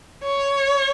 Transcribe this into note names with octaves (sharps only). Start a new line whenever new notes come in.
C#5